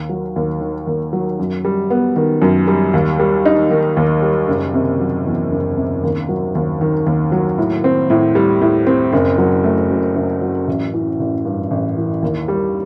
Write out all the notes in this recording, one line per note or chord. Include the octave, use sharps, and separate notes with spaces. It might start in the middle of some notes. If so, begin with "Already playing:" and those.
Already playing: D#2
F#3
D#2
D#3
D#2
F#3
F#2
G3
B3
D#3
F#2
G3
D#2
G3
D#4
D#3
D#2
G3
F#1
C3
F#3
E2
F#1
C3
D#2
F#3
D#2
D#3
D#2
F#3
A2
C4
A2
G3
A2
C4
F#1
F#3
A3
F#2
F#1
F#3
A1
E3
A1
G2
A1
E3
D#2
G3